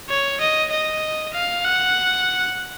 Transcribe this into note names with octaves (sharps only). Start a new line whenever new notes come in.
C#5
D#5
D#5
F5
F#5